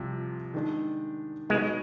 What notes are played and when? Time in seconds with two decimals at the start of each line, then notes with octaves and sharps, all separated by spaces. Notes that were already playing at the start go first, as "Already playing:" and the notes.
Already playing: C2 C3 F3
0.54 D#3 G#3 D4
1.49 B2 G#3 B3 D#4 B4